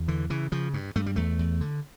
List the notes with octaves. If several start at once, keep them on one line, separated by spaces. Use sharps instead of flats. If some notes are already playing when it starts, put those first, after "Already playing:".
Already playing: E2
D3 E3
C#3 E3
C#3 F3
G2
G2 A3
G3
E2 A3
E2
D3